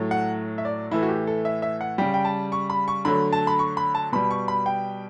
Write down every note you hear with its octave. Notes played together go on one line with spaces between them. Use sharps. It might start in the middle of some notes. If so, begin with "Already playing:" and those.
Already playing: A2 F#3 A3
F#5
E5
D5
A2 E3 A3 E4
F#4
G4
A4
E5
E5
F#5
C#3 G3 G5
G5
A5
C#6
B5
C#6
D3 F#3 A3 B5
A5
B5
C#6
B5
A5
B2 G3 B5
C#6
B5
G5